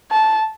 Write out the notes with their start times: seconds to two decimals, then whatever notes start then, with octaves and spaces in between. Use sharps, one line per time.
0.11 A5